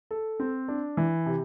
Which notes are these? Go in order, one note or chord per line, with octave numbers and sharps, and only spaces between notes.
A4
C4
D4
E3
C3